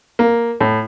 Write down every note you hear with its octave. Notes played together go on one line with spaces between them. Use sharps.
A#3
A2